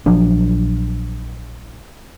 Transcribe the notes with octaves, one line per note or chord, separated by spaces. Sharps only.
A#1 F3 F#3 D4